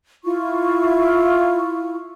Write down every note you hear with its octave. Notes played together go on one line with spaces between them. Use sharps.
E4 F4 C#6